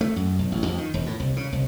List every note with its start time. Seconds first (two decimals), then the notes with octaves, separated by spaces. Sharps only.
0.01 A3
0.16 F#2
0.39 B1
0.52 A1
0.66 F2
0.78 D#3
0.94 E1
1.06 A2
1.20 C2
1.36 C#3
1.52 C2